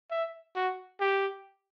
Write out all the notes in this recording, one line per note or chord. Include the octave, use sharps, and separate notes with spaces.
E5
F#4
G4